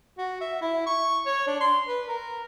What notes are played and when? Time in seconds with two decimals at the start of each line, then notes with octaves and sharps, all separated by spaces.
0.18 F#4
0.41 E5
0.62 E4
0.86 C#6
1.26 C#5
1.47 D4
1.60 C6
1.87 B4
2.08 A#4